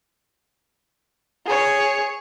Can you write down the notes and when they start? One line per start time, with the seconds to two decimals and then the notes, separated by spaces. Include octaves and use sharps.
1.46 G#4 C#5